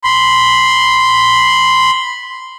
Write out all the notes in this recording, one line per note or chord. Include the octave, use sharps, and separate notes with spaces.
B5 C6